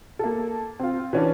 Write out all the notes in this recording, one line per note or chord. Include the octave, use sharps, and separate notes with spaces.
A#3 A4
C4 F4
E3 C#4 D4